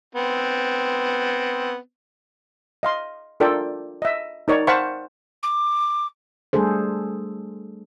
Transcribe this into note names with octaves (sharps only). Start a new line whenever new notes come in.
B3 C4
D#5 F5 C6
D4 F4 A4 A#4 D5 G5
D#5 E5
D#4 A#4 C#5 D5
C5 F5 F#5 A5 B5 C#6
D6
G3 A3 D4 G#4 A4 C5